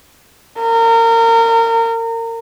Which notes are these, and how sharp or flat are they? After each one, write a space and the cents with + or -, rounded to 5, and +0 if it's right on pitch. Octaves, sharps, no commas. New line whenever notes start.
A#4 -30